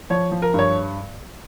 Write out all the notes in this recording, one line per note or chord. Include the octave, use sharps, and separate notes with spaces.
F3 C#5
F3
A#4
G2 C#5